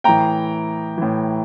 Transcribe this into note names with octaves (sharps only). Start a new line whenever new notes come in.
A2 E3 G5 A#5
A2 E3